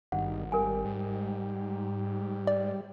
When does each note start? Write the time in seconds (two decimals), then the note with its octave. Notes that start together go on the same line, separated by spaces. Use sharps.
0.12 G#1 G2 D#3 F#5
0.52 G3 A#4 G#5
0.85 G#2
2.47 D5